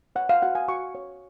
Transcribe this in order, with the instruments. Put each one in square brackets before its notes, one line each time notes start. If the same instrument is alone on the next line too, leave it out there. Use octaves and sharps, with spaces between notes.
[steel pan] C#5 F#5
F5
F#4 F#5
G#5
F#4 C#6
C#5